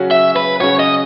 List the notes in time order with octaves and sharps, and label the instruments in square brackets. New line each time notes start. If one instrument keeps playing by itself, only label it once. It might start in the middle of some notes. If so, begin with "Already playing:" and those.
Already playing: [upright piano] C#3 F#3 C#4 F#4
[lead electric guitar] E5
B4
[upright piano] C#3 F#3 C#4 F#4 [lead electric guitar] C#5
[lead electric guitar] D#5